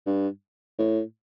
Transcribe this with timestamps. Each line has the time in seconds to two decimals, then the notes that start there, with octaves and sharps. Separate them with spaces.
0.06 G2
0.79 A2